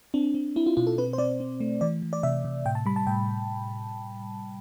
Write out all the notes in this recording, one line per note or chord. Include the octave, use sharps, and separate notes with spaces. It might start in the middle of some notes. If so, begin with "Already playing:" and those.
C4 D4
C4
C4 E4
F4
B2 F4
A4
C4 B4
C5
C4 D5
C4
A3
E3 D5
E3
D5
C3 E5
C3
A2 G5
A5
G3 B5
A5
A2 G5